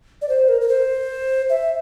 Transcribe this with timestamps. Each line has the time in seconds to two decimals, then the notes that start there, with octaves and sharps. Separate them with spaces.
0.22 D5
0.29 C5
0.49 A#4
0.61 A#4
0.69 C5
1.50 E5